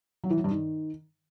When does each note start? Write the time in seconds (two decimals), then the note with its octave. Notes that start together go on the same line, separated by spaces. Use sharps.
0.24 F#3
0.30 E3
0.37 F#3
0.44 G2
0.51 D#3